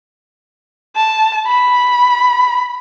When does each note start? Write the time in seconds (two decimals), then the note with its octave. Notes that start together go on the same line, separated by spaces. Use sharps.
0.96 A5
1.47 B5